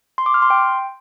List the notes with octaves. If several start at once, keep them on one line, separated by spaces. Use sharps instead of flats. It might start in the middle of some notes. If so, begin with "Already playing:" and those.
C6
D6
F6
C6
G5